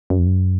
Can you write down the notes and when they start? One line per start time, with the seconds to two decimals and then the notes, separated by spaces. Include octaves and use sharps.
0.10 F#2
0.19 F2
0.26 F#2